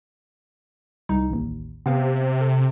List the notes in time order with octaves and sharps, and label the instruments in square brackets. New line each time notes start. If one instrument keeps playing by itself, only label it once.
[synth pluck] C2 D#4
A1 D#2
[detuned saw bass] C3 [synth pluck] B3 F5 G5
[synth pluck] A4